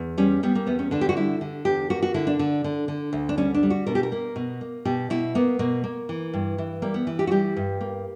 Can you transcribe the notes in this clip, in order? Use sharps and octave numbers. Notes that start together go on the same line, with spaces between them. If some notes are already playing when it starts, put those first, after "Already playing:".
Already playing: E2
G3 C#4
G3 B3
A#3
E2 B3
C#4
D3 D4
G4
F#4
G3 E4
D3
E2 G4
A#3 F#4
F#4
D3 E4
D4
D3
D3
D3
D2
D4
G3 C#4
D4
G3
F#4
B2 A#4
G4
A#4
A#3
B2
A#3
B2 G4
B2 E4
A#3 B3
B2 A#3
A#3
E3
G2
E3
G3 A#3
B3
E3
G4
F#4
G3 G4
G2
A#3